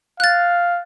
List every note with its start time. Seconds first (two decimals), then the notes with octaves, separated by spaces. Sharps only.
0.20 F5 F#6 A6